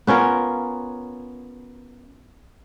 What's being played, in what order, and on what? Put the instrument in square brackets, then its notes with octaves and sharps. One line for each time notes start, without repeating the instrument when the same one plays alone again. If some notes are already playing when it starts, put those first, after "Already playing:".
[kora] B3 C#4 F4 A#4